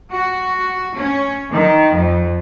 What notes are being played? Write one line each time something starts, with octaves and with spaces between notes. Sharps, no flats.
F#4
C#4
D#3
F2